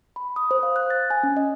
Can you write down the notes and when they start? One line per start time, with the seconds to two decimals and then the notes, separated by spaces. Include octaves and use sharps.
0.16 B5
0.36 D#6
0.51 C5
0.63 F5
0.76 F#6
0.90 A6
1.10 G#5
1.23 C#4
1.37 D#5